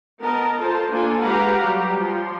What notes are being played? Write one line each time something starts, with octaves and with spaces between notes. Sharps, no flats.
B3 A#4 D#5 A5 A#5
F4 A4 C5 A5
A#3 D4 F4 A4 G#5
G#3 G4 B4 F5 F#5 A#5
F#3 G3 G4
F3 C6